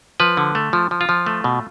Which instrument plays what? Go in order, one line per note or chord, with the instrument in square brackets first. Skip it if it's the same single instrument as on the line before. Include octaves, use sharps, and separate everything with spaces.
[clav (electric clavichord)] F3 B4
D3
A3
F3
F3
F4
F3
A3
B2